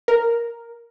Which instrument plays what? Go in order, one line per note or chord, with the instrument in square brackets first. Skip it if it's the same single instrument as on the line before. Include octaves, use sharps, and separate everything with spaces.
[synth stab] A#4